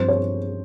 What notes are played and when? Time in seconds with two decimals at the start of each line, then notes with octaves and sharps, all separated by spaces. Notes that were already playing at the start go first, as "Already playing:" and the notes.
Already playing: G2 F3 C4 C5
0.08 C#5